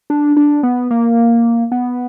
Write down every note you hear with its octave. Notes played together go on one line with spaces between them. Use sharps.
D4
D4
B3
A#3
B3